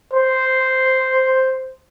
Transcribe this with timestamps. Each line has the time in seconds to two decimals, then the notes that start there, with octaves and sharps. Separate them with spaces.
0.13 C5